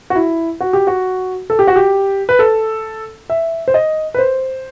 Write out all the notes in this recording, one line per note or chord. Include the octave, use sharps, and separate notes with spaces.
F#4
E4
F#4
G4
F#4
A4
G4
F#4
G4
B4
A4
E5
C5
D#5
B4
C5